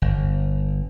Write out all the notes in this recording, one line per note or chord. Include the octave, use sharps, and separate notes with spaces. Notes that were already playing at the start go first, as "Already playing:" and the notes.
G1